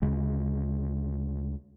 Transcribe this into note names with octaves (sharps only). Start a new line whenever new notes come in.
D2 C#3 G#3